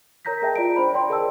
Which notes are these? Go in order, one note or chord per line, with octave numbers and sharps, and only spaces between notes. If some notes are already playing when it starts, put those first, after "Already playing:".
A#4 C#5 A#5 G6 A#6 B6
G#4 A#4 D#5 E5 G5 A5
F4 D5 A#5 D7
D4 C5 B5
C#5 D5 G5 C6
G#4 A#4 D#5 G5 A5 E6